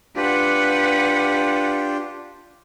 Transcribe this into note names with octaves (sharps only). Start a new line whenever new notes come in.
D4 F4 G4 B4 F#5